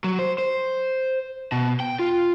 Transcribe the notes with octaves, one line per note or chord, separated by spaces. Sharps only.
F#3
C5
C5
B2
G5
F4